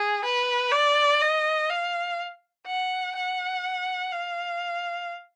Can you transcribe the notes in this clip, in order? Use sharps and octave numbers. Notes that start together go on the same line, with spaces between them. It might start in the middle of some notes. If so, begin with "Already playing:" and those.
Already playing: G#4
B4
D5
D#5
F5
F#5
F#5
F5